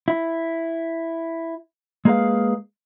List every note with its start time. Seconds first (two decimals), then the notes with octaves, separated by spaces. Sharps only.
0.08 E4
2.05 G#3 A#3 G#4 B4 F5